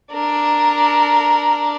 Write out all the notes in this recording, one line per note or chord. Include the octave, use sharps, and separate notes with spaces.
D4 A#4